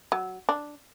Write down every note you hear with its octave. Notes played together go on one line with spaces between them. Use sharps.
F#3
D4